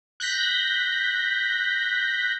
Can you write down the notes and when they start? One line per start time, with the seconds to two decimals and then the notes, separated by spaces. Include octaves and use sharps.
0.20 F#6 G6 A#6 B6